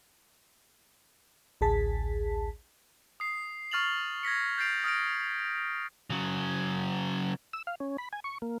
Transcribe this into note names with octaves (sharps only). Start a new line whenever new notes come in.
A1 D2 G#4 A5 B6
D#6 C7
C#6 F6 A6 F7 F#7
G#6 A#6 B6 C#7
G6 A6 C7 D7 F7
D#6 F6 A#6 D7
C#3 F#3
E6
F5
C#4
B5
G#5
C#6
A#3